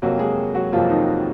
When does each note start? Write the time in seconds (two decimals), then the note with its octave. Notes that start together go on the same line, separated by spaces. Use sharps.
0.02 F2 C3 F#3 A#3 F#4
0.19 G#3 G#4
0.55 F#3 F#4
0.72 F2 C3 F3 F#3 A#3 F4
0.90 D#3 D#4